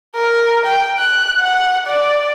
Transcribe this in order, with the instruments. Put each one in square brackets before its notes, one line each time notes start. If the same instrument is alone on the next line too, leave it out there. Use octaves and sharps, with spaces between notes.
[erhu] A#4
G5
F#6
F#5
D5